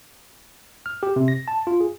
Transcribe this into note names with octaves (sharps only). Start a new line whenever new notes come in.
F6
G4
C3
A#6
A5
F4
G#4